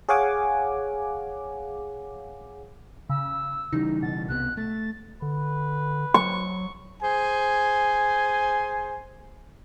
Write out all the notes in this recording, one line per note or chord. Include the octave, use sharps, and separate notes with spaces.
G#4 C#5 F5 F#5 G#5 D6
C#3 E6
C#3 E3 G3 D#4
B2 A6
C2 C3 B3 F#6
A3 A6
D3 B4
F#3 C#6
G#4 C5 G#5